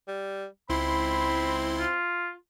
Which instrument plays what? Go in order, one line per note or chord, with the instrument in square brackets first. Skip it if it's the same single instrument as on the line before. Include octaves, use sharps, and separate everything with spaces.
[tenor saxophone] G3
[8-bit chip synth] C#2 E4 C6 [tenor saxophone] C4 [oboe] B5
[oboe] F4